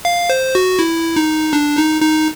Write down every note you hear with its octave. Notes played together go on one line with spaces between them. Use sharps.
F5
C5
F#4
E4
D#4
D4
D#4
D#4